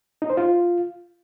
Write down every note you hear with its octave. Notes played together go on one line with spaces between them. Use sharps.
D#4
C5
F4